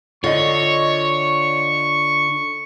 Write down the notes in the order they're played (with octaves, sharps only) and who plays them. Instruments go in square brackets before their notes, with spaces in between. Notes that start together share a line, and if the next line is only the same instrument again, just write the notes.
[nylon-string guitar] D3 [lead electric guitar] F4 D#5 [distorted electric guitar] C#5 [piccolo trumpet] C#6